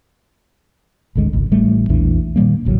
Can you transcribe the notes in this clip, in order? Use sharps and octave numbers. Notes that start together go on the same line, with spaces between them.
G#1 D2 D3 G#3
G#1 C#2
A1 G3 A3
A#1 E2 E3 D4
A#2 D#3 G3 A#3
D#1 A1 C#3 F#3